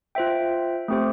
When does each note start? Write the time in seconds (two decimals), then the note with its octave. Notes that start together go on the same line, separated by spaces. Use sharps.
0.15 F4 C5 E5 G5
0.88 A3 C4 G4 C5